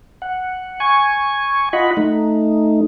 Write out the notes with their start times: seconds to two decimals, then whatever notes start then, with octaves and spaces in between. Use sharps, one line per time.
0.22 F#5
0.80 G#5 C#6
1.73 F4 D#5 F#5 B5
1.97 A3 D#4